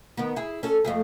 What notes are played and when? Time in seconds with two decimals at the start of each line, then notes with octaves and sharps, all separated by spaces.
0.17 D#3 B3
0.36 E4 G#4
0.63 C#4 A4
0.85 F2 A3 G#4